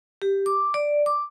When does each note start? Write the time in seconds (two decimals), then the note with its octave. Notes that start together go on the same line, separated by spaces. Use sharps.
0.22 G4
0.46 D6
0.74 D5
1.06 D6